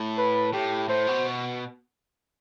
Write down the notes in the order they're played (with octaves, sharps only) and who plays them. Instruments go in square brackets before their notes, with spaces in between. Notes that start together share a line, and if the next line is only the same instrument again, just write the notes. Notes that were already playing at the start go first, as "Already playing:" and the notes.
Already playing: [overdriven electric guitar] A2
[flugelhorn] B4
[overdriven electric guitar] A2 [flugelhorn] G4
[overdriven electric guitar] A2 [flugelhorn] C5
[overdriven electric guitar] B2